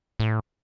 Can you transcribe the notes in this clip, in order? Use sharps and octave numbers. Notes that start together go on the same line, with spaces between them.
A2